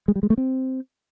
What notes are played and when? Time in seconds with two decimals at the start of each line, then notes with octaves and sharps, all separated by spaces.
0.08 G#3
0.16 G3
0.23 G#3
0.30 A3
0.38 C4